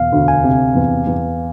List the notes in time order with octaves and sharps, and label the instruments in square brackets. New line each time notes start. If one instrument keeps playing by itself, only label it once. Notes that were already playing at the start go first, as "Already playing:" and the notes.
Already playing: [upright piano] E1 [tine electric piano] F5
[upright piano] D2
[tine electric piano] G#5
[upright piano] C3
E2
E2